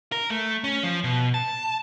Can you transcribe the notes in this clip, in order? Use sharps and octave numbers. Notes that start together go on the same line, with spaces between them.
A#4
A3
C#4
F3
B2
A5